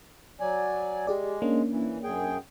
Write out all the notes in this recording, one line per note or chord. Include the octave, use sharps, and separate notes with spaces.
F#3 D5 G#5
G#3 G4 G#4 D5
A#3 C#4 D4
E3
F#2 G#4 G5